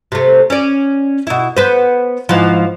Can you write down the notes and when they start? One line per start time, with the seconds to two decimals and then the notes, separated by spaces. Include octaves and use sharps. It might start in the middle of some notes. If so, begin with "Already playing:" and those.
0.12 C3 A3
0.50 C#4 D5
1.27 B2 E4
1.57 B3 B4 C5
2.29 G#2 E3 F3